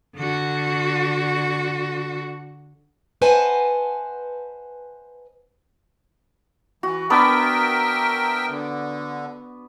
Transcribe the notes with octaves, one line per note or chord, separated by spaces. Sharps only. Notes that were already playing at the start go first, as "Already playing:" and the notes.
D3 F#4
B4 C5 D#5 F#5 G#5 A5
E3 F#4
B3 D4 A#4 B4 E5 G5
D3